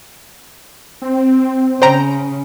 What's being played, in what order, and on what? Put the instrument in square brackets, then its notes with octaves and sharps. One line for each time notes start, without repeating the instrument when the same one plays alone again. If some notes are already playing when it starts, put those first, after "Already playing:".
[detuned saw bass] C4
[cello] C#3 [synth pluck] C5 G5 A#5